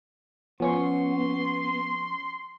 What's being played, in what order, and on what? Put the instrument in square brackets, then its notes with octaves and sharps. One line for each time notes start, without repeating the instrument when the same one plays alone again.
[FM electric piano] F3 C#4 C#6 [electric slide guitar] B3 [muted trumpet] C6